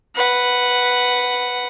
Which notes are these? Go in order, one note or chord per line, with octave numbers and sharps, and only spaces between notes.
B4 F#5